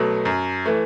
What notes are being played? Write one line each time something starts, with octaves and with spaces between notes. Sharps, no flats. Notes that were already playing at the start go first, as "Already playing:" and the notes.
Already playing: B2 F#3 A3
F#2
E3 A3